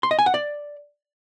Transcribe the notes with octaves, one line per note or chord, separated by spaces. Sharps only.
C6
D#5
G#5
F#5
D5